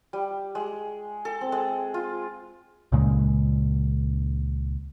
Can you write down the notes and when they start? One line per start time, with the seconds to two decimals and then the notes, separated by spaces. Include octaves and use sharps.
0.13 G3
0.55 G#3
1.25 A4
1.41 C4
1.52 G#3
1.94 F4
2.92 C#2 A#2 C#3 G#3